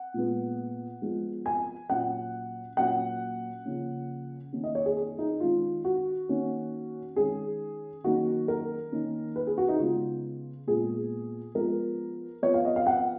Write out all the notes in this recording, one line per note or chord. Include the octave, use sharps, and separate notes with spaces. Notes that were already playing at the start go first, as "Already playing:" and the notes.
Already playing: F#5
A#2 G#3 B3
F3 G#3 B3
G#5
A#2 F#3 C#4 F#5
A#2 F#3 A#3 C#4 F#5
C#3 F3 A#3 C#4
D#3 A#3 C#4
D#5
C#5
G#4
G#4
D#4
D#3 G#3 C#4 F4
F#4
D#3 A#3 C#4
D#3 G#3 C#4 G#4
D#3 F#3 A#3 C#4 F#4
A#4
D#3 A#3 C#4
B4
G#4
F#4
D#4
C#3 G#3 B3 F4
A#2 G#3 B3 G#4
F3 G#3 B3 A#4
F3 B3 C#5
F5
D#5
F5
F#5